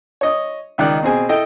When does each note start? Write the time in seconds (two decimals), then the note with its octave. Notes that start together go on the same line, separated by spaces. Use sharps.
0.21 C#5 D#5 D#6
0.78 C#2 D#3 D5 F#6
1.03 B2 C4 G#4 G#5
1.29 E4 A4 D#5 G5